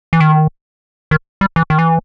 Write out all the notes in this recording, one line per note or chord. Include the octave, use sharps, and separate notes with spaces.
E3
D#3
D#3
G3
E3
D#3
E3